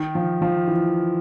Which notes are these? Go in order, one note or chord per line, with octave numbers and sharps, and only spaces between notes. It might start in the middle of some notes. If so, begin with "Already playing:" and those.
Already playing: D#3
F3
F3
E3